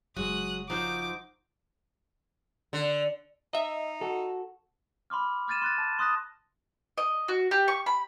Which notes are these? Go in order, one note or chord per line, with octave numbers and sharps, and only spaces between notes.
F#1 F#3 G#3 F#4 D#6 F#6
F3 D#4 F#4 C5 D6
D3
D#4 D#5 E5
F#4 A4
B5 C6 D6 F6
D6 F6 G#6 A6 D#7 E7
C6 F#6 A6
A5
C6 D#6 F#6 A#6
D#5
F#4
G4
C#6
B5